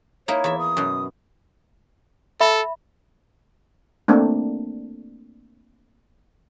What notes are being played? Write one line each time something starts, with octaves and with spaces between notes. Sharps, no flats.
A#3 D#4 E4 C#5
E2 E5
D#6
F#2 B2
A4 E5 B5
A3 A#3 C4 D4